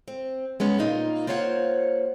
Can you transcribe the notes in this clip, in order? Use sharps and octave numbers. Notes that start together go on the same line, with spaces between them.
C4
G#3 B3 C#4
A#2 A#3 D#4 F4
A#3 F4 C5 C#5 F5 F#5